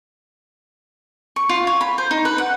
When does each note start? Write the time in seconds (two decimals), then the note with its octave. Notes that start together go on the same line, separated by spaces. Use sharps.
1.36 C#6
1.49 F4
1.67 C#5
1.81 B5
1.98 C5
2.11 D#4
2.25 B4
2.38 F#5